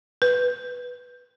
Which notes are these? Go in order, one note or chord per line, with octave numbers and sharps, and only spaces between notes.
B4